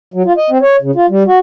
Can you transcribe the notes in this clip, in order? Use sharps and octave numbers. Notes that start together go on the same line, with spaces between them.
F#3
F4
D#5
C4
C#5
C#3
F4
G3
F#4